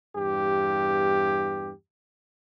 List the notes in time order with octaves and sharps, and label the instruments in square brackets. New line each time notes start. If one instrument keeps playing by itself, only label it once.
[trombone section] E2 G2 G4